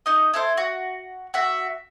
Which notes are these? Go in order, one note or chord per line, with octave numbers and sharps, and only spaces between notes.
D#4 D#5
E4 A4 C5
F#4
F#4 E5